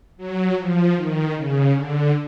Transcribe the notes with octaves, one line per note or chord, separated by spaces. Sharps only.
F#3
F3
D#3
C#3
D3